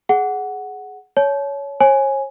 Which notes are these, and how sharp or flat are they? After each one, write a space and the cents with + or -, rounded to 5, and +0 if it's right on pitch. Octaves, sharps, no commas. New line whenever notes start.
G#4 +15 F#5 +0
C#5 +15 A5 -40
C#5 -40 G#5 +0